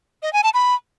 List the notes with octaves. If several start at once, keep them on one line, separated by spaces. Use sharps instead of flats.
D#5
G#5
A5
B5